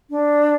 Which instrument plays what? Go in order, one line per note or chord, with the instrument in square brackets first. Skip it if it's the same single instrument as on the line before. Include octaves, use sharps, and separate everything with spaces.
[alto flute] D4